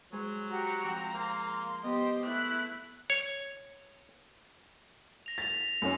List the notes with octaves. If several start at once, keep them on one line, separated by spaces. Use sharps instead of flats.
F#3 G#3 G#4 C5
F#4 G4 A#5 G6
F3 C4
A#3 C6
B3 G4 C5 D#5 C6
A3 E4 F#6
C#5
A#6 F7
A6 B6 F7
F#2 C#4